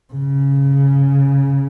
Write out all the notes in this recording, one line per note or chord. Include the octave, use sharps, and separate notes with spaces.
C#3